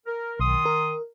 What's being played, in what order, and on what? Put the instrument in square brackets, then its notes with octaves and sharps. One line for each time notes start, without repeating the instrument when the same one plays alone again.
[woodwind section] A#4
[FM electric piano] B1 [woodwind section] D#3 C6 D#6
[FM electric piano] A#4